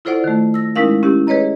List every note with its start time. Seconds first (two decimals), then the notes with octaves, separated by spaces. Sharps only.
0.05 E4 F4 A4 C5 D5 F#5
0.24 D#3 A3
0.54 E6 A#6
0.76 G#3 C#4 D#4 E4 A#4 F5
1.03 C#4 E4 G4
1.27 G#4 B4 C#5 D#5 A#5